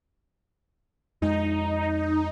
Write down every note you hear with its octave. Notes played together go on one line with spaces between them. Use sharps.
F2 G#3 D#4